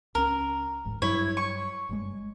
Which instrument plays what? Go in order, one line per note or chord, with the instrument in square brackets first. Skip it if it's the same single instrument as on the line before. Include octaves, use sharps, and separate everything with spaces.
[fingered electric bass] C#2 C#4 [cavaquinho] A#4
[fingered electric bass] D1 A1 G#2
[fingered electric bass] G2 F#3 [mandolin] E4 [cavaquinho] C#5
[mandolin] C#6
[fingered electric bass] F#1 G2 G#3